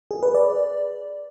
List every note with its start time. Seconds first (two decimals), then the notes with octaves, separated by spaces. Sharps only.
0.11 G#4
0.23 B4
0.35 D5